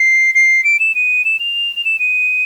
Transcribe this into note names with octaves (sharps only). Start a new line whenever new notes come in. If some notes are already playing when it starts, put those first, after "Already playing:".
Already playing: C7
C7
D7
E7
D#7
E7
F7
F7
E7
D#7